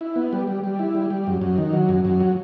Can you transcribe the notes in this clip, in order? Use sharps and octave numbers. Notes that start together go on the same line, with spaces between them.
E4
B3
G3
G3
G3
E4
G3
G3
F#2
F#2
D#3
F#3
F#2
F#2
F#3